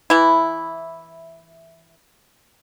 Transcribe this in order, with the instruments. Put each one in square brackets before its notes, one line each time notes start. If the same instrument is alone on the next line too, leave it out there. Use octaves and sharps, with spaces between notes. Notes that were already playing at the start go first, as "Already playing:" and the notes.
[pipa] E3 E4